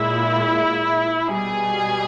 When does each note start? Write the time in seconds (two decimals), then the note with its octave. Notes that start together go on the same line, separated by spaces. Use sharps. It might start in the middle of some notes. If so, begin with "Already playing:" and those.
Already playing: A#2 G#3 E4
1.28 B2 G3 G#4